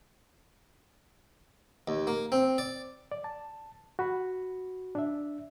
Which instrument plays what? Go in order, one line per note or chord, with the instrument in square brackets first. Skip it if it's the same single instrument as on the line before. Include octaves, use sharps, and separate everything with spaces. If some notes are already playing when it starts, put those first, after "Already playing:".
[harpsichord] D#2
A#3
C4
D5
[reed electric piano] D5
A5
F#4 B5
D4 E5